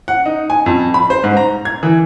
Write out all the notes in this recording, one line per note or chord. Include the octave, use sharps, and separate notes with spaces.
F#5
D#4
G#5
F2
B5
C5
G#2
A#5
G#6
E3